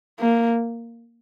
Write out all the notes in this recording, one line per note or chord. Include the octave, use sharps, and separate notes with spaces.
A#3